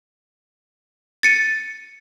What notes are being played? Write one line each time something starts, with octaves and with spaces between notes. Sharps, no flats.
A6 C#7 D#7